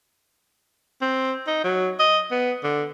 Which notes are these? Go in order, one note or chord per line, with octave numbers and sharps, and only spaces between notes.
C4
D#4
F#3
D#5
B3
D3